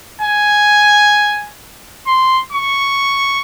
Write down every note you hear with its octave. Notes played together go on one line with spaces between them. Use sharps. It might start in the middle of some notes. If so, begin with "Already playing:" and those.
G#5
C6
C#6